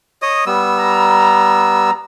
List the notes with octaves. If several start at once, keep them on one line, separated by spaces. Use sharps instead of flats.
C#5 D#5 D#6
G3 B3 E6
A#5